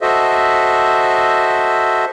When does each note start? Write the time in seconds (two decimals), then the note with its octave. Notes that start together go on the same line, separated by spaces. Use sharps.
0.01 F#4 A4 C5 D#5 E5